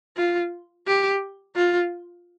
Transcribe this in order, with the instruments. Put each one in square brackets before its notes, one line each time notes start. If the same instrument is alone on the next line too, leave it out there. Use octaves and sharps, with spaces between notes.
[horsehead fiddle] F4
G4
F4